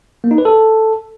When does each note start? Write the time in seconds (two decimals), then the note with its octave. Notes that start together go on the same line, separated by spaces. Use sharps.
0.24 A#3
0.31 D#4
0.38 B4
0.45 A4